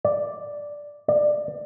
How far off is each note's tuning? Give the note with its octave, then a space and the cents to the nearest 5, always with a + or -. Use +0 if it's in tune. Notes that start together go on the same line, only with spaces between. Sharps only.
D5 +0
D5 +20